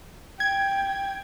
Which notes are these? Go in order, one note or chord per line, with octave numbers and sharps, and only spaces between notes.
G5 G#6